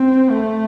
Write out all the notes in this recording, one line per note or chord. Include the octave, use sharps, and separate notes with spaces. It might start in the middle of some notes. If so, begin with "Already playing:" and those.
Already playing: C4
A3